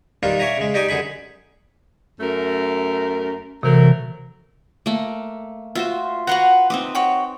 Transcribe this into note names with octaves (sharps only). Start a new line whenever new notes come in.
G2 D#3 A#3 D4 F4
C#5 D5 E5 G#5 A#5
C#3 G#3
D#4 G4 D5 D#5 G#5 D6
F#2 D3 G#4 G#5 B5
F#2 A3 A#4
C3 E3 F#3 A3 A#4
A3 A#3
F4 F#4 C5 E5
F#4 B4 F#5 A#5 C6
C4 D#4 B4 E5 D6
F#4 C#5 G5